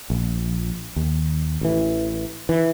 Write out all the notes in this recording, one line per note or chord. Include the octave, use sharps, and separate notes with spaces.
A#1
D#2
A1 E3
E3